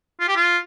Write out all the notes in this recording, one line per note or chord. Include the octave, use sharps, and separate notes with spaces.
F4
G4
F4